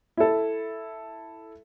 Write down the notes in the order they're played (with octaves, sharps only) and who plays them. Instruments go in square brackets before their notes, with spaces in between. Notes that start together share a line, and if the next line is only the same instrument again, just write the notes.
[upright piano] E4 A4